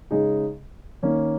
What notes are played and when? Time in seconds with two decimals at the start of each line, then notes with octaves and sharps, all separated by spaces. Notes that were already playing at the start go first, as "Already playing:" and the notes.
0.11 C#3 G#3 D#4 G#4
1.03 D#3 A#3 C#4